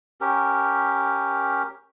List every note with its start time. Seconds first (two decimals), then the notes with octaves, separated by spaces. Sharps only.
0.21 C#4 G4 A#4